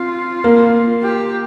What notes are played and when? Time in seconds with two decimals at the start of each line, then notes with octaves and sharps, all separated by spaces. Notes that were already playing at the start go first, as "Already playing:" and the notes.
Already playing: C4 F4
0.44 A#3
1.02 G4